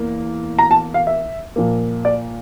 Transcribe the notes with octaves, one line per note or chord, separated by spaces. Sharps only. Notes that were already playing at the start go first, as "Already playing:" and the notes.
Already playing: E2 E3 A#3
A#5
A5
F5
E5
A#2 F3 A#3
D5